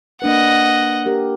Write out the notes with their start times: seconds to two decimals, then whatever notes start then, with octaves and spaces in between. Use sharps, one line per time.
0.22 A#3 D4 B4 D#5 F#5
1.06 G4 A#4